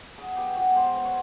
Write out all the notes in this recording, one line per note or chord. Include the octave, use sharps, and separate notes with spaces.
F#3 G#4
B3 G4
B2 F#4
G#3 C5
B3
C#5